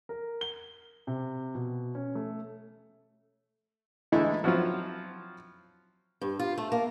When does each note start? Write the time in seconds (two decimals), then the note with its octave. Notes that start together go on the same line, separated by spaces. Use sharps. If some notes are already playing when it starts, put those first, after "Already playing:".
0.09 A#4
0.41 G7
1.07 C3
1.55 B2
1.95 C#4
2.15 A3
4.12 D3 E3 G#3 A3 D#4 E4
4.44 F3 F#3 C4 E4 F4
6.21 G2
6.39 F4
6.58 A3
6.72 A#3